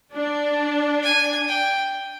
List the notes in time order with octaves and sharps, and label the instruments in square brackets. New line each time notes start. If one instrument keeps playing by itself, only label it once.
[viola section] D4
[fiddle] G#5
G5